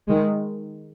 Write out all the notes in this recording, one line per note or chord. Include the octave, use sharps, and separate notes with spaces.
D#3 G#3